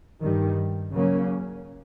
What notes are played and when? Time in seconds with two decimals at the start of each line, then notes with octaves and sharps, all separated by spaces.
0.22 G2 D#3 G3
0.93 C#3 F#3 A#3 C#4